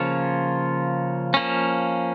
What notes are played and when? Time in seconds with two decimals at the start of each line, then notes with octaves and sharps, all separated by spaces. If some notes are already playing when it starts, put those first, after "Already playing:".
Already playing: C#3 F3 A#3 F4 C#5
1.34 F3 A#3 C#4